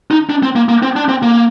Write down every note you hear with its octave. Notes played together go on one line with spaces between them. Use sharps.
D#4
D4
C4
A#3
A#3
C4
D4
C4
A#3